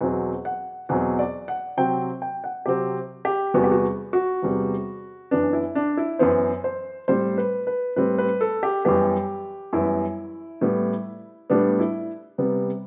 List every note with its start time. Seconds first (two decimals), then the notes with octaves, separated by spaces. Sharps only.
0.01 E2 B2 F#3 C4 F#5
0.45 F#5
0.89 E2 B2 F#3 C4 F#5
1.19 D5
1.48 F#5
1.77 C3 F#3 C4 G5
2.22 G5
2.44 F#5
2.66 C3 F#3 C4 G4
3.25 G4
3.54 E2 C3 G3 B3 F#4
3.64 G4
3.72 F#4
4.13 F#4
4.42 E2 C3 G3 B3
5.31 F#2 E3 B3 D4
5.53 E4
5.75 D4
5.97 E4
6.19 F#2 E3 B3 C5
6.64 C5
7.08 A2 G3 C4 C5
7.38 B4
7.67 B4
7.96 A2 G3 C4 B4
8.18 B4
8.41 A4
8.63 G4
8.85 F#2 E3 G3 B3 G4
9.73 F#2 E3 G3 B3 E4
10.61 A2 G3 B3
11.50 A2 G3 B3 D4
11.80 E4
12.38 C3 G3 B3